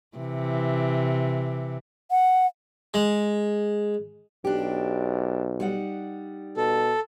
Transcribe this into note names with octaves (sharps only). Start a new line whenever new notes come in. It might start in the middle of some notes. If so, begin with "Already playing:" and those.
C3 E3
F#5
G#3
B1 D4 G4
G3 D#4 F#5
B2 A4